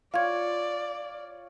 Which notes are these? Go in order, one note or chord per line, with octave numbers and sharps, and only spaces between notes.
F4 C#5 D5 F5 G#6